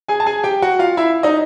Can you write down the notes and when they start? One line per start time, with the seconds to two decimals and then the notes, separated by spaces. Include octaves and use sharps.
0.08 G#4 G#5
0.20 A5
0.26 G#4 G#5
0.44 G4 G5
0.62 F#4 F#5
0.79 F4 F5
0.97 E4 E5
1.23 D#4 D#5